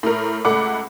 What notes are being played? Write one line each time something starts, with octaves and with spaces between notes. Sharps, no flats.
A2 A#4
C#2 A3 F#5 B5 D6